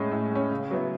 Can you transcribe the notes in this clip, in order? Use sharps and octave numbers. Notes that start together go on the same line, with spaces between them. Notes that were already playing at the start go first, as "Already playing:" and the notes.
Already playing: A2 G#3 C#4
A2
G#3 C#4
C#3
F#3 B3 E4